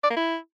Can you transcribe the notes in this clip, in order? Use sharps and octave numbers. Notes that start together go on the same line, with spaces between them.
D5
A#3
E4